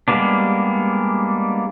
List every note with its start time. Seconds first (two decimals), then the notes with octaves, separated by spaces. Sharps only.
0.08 G3 G#3 A#3 B3 D4